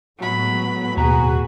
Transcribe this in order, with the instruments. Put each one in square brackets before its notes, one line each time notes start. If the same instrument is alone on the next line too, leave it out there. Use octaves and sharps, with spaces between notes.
[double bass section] A2 G#3 B3 [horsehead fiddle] F#3 B5
[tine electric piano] D#2 [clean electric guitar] B2 A#5 [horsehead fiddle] F#4 G#4